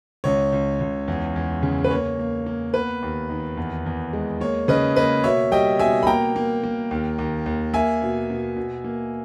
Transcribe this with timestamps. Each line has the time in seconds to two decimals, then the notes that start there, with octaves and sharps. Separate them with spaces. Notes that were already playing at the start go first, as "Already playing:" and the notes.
0.24 C#2 C#5
0.52 C#2
0.80 C#2
1.08 E2
1.36 E2
1.63 C#3
1.84 B4
1.91 A#3 C#5
2.19 A#3
2.46 A#3
2.74 B3 B4
3.02 D#2
3.29 D#3
3.57 E2
3.86 E2
4.13 G#3
4.40 A#3 C#5
4.68 C#3 B4 D#5
4.96 A#3 B4 D#5
5.24 B2 C#5 E5
5.52 G3 D#5 G5
5.79 B2 E5 G#5
6.03 B5
6.07 A#3 G5 A#5
6.36 A#3
6.63 A#3
6.91 D#2
7.18 D#2
7.46 D#2
7.74 A#3 E5 G#5
8.02 B2
8.30 B2
8.57 B2
8.84 A#3